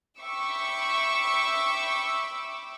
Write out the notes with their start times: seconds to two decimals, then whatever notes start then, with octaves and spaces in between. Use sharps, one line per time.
0.19 E5 G5 B5 C#6 D6 E6